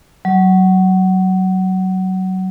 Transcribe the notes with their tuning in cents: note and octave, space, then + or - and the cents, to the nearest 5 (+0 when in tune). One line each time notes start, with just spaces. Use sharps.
F#3 +20